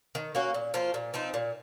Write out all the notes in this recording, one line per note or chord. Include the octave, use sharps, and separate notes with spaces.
D#3
A#3 C#4 F#4
A#2
F3 A#3 F4
A#2
F3 C4 D#4
A#2